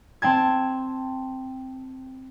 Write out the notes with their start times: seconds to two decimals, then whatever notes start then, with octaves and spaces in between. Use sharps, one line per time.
0.22 C4 G5 A5 G#6